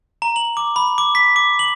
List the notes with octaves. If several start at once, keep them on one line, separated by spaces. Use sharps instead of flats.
A#5
F#7
D6
B5
D6
B6
D6
F#7